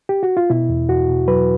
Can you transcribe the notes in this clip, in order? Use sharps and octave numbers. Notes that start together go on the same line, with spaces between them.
G4
F#4
F4
B2 E4
E2
E2 F#4
B2
F#3 B4